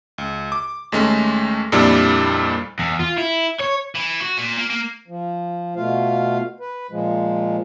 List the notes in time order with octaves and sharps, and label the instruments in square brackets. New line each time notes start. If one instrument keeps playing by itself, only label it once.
[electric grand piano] C#2
D6
D#2 G#3 A3 C#4
F2 A#2 G3 A#3 D4 E4
[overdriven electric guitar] E2
F4
E4
C#5
[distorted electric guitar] E3
F#4
A#2
A#3
A#3
[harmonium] F3
B2 A3 F4 F5
B4
A#2 F3 G#3